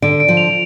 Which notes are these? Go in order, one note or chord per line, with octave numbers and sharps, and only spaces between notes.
D3 D7
D7
F3
F7